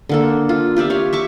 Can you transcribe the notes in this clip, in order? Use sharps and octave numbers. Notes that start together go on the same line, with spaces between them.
D3 A#3 A4
F4
F4 G4 D5 E5
C#5 F5
E5 C#6 D6